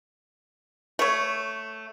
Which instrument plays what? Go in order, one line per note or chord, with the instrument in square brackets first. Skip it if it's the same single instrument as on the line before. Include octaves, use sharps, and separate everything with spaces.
[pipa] A3 C#5